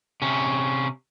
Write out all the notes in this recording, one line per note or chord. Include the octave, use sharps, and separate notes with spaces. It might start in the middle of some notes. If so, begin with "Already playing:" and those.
C3 C#4